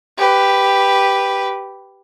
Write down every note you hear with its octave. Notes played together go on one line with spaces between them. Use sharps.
G4 B4